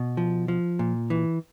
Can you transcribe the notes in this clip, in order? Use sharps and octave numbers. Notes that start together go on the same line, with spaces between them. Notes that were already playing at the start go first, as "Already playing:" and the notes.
Already playing: B2
F3
F3
A#2
E3